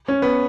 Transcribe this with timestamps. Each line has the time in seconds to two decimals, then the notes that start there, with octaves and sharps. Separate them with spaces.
0.08 C#4
0.22 B3